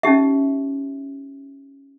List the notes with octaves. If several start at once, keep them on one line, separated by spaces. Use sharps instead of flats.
C#4 D#4 G4 E5